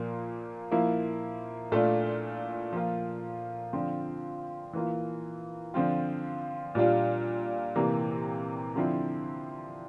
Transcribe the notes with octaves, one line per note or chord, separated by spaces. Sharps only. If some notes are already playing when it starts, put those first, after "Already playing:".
Already playing: A#2 F3 A#3
F3 A#3 E4
A#2 A3 D4 F4
F3 A#3 F4
D3 F3 C4 F4
E3 A#3 F4
D3 F3 C4 F4
A#2 G3 D4 F4
C3 E3 A#3
D3 F3 C4 E4